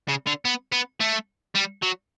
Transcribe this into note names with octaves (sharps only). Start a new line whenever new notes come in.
C#3
D3
B3
B3
A3
G3
F#3